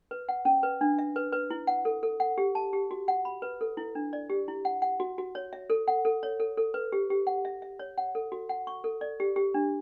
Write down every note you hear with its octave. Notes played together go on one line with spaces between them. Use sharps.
B4
F#5
C#4
B4
D4
E5
B4
B4
E4
F#5
A4
A4
F#5
G4
A5
G4
F#4
F#5
B5
B4
A4
E4
D4
D5
G4
E4
F#5
F#5
F#4
F#4
C#5
E5
A4
F#5
A4
C#5
A4
A4
B4
G4
G4
F#5
E5
E5
C#5
F#5
A4
F#4
F#5
C#6
A4
D5
G4
G4
D4